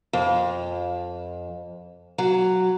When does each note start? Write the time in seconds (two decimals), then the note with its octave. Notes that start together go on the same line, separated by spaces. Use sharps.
0.13 F2
2.18 F#3